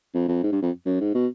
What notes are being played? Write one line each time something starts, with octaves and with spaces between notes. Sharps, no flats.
F2
F2
G#2
G2
F2
F#2
G#2
B2